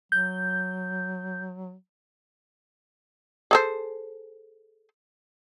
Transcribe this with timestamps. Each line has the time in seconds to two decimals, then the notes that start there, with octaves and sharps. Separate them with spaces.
0.12 F#3 G6
3.51 G#4 A4 C5